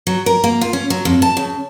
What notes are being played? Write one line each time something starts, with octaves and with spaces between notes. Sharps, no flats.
F#3
A#4
A#3
F4
C#4
F#3
F2
A5
C#3